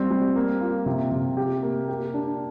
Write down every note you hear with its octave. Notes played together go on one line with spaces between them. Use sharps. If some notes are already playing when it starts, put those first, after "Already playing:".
Already playing: G3 C4
G3
A#3
F4
C3
C3
G4
A#3
G4
D4